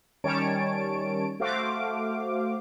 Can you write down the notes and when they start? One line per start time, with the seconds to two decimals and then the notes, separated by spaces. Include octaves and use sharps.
0.24 D#3 G3 C#4 C#5 A5 D7
1.40 A3 F#4 C5 F5 D6